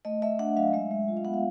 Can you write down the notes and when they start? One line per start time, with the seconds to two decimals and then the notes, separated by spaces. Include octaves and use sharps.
0.05 A3 D#5
0.22 A3 E5
0.39 D4 F#5
0.56 F#3 F5
0.73 G#3 E5
0.91 G#3
1.08 F4
1.17 F5
1.25 B3 F#5
1.34 F5